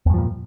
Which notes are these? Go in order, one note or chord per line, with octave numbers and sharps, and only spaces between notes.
E2 G2 A#2 F3